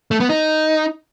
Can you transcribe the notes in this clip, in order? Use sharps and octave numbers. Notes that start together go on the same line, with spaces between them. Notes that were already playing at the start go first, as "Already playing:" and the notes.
A3
B3
D#4